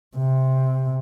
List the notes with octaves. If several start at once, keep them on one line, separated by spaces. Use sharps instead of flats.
C3